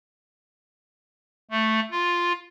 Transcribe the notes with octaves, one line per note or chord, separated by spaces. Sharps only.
A3
F4